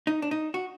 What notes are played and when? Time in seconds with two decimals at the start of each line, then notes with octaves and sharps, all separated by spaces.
0.07 D#4
0.22 D4
0.31 D#4
0.54 F#4